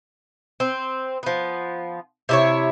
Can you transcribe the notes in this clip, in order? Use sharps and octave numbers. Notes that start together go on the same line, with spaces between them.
C4
F3 B3
C3 E4 C#5